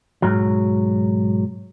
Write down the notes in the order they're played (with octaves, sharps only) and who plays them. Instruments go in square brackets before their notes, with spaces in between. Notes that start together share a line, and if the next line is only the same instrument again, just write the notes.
[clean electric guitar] B1 G#2 F#3